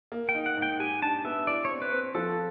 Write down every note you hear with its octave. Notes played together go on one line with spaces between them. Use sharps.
A#3
G5
D#4
F#5
G#2
G5
G4 G#5
D4 A5
B3 E5
E4 D5
C#5
C4
B4
C4
F3 A4